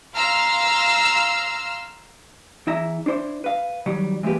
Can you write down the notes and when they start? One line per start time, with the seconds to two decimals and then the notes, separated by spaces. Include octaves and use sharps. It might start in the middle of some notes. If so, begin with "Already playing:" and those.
0.15 F5 A#5 C6 E6 F6
2.67 E2 E4 E5 A#5
3.06 D4 E4 C5
3.44 B4 F5
3.86 D#3 F#3 G3
4.23 E3 G#3 A#3 G4 B4